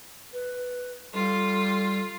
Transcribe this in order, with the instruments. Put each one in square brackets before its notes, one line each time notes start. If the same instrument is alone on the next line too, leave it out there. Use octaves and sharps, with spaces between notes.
[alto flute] B4
[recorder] G3 [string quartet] F4 [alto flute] A4